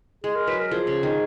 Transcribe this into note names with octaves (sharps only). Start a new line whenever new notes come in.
G#3 G#4
A#4
F#3 B4
A#4
F3 G#4
C#3
D#3